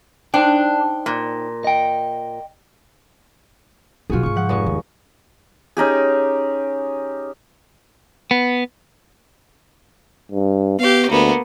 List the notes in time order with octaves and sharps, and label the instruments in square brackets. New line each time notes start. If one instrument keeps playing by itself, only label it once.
[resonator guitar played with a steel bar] D4 [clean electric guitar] D#4 C5 G5
[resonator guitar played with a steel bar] A#2
[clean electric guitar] D#5 G5
[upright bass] F#2 B2 [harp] F4 F#4 G#4
[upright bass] G#2 C#3 [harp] C#6
[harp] F3 F#5
F1 G#3 C#6
[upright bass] D#2
[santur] C#4 D#4 G4 G#4
[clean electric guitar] B3
[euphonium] G2
[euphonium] B3 [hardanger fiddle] G4 F5
[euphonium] D2 [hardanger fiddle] A#3 B3